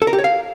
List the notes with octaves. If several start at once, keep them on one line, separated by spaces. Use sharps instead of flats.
A4
A#4
G4
C#5
F5